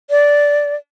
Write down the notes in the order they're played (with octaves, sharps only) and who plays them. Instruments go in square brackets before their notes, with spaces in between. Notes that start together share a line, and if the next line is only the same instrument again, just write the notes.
[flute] D5